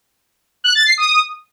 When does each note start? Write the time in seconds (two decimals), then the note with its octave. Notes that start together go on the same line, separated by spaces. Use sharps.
0.64 F#6
0.75 A6
0.86 C7
0.98 D#6